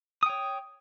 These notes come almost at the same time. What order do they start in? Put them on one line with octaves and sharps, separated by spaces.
D#6 G5 C#5